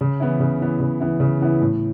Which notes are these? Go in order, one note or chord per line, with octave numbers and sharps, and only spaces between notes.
C#3
E3 B3 E4
C#3
E3 B3 E4
C#3
E3 B3 E4
C#3
E3 B3 E4
A2